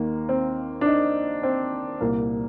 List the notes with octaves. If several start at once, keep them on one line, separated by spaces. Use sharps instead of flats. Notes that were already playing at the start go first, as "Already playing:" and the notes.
Already playing: D#2 D#3 A#3
C4
D4
D#4
C4
C2 A#2 A#3